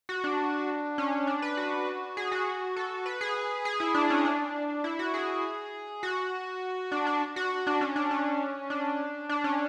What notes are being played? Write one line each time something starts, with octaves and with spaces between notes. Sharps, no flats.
F#4
D4
C#4
D4
B4
F#4
G#4
F#4
A4
B4
G#4
G#4
E4
D4
C#4
D4
E4
F#4
G#4
F#4
D4
D4
F#4
D4
C#4
D4
C#4
D4
D4
C#4